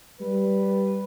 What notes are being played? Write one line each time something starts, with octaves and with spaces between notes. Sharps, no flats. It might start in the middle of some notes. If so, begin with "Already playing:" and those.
G3 B4